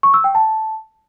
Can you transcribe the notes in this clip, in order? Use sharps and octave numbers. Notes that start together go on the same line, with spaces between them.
C#6
E6
G5
A5